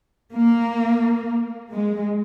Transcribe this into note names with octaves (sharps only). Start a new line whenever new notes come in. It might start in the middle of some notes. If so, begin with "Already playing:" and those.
A#3
G#3